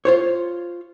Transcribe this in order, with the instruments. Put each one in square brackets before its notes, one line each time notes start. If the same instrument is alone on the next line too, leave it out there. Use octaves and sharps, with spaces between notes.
[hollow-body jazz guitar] F4 C5 C#5